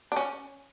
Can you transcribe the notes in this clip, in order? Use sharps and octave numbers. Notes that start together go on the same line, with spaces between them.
D4
C#4